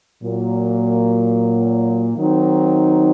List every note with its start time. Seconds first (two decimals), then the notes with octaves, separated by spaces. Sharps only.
0.23 A#2 F#3 A#3
2.16 D#3 F#3 C4 D#4